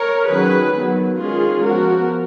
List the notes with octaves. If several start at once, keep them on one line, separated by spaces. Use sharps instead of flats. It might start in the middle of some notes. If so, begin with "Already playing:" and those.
Already playing: A#4 C#5
D#3 F#3 C#4 G#4 B4
D#3 F#3 B3
D#3 G#3 C#4 F4 G#4
F3 B3 F#4 A#4